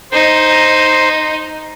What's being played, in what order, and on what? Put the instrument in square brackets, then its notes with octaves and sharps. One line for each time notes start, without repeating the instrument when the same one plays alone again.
[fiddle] D#4 [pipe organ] C5